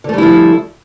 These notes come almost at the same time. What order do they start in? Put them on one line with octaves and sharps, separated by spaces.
D3 A3 G3 E4 F3